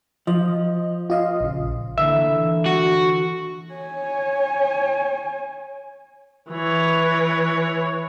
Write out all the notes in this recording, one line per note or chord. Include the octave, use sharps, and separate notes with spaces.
F3 D#5
F4 D#5 F5
A#1 C#3
D3 E3 A#3 E5
F#4
C#5 G#5
E3 C#5